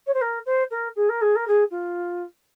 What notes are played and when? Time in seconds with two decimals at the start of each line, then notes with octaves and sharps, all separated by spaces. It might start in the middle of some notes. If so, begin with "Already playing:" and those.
0.06 C#5
0.14 C5
0.21 A#4
0.46 C5
0.71 A#4
0.96 G#4
1.09 A#4
1.21 G#4
1.36 A#4
1.47 G#4
1.71 F4